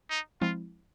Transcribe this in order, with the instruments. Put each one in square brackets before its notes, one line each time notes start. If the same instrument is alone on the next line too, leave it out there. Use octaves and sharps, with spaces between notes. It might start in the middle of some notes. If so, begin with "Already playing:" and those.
[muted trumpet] D#4
[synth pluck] F3 G#3 C4 E4 [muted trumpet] F4